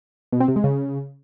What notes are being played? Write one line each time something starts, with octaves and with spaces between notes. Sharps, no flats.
B2
C4
C3
G#3
C#3